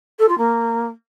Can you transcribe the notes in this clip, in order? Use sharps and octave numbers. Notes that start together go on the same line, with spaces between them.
A4
F4
A#3